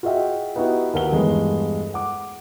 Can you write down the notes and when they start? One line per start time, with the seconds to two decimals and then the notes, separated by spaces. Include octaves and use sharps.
0.03 F4 F#4 G#4 D#5 E5 G5
0.56 B3 D#4 E4 F#4 G4
0.93 D#2 A#4 B4 F#5 G7
1.12 E2 G2 G#3 A3 B3
1.94 F#5 D6